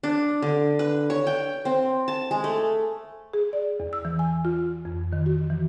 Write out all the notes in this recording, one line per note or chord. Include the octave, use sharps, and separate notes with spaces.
D4
D3
B4
C#5
G5
C4
A5
G#3
A3
G#4
D5
E2
E6
E3
G#5
F4
F2
D#3
F#4
E3